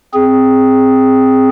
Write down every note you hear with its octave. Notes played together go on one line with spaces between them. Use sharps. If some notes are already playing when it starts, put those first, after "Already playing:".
C4 G#4